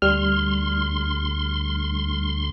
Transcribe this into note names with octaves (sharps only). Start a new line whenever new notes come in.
D2 G3 C6 F6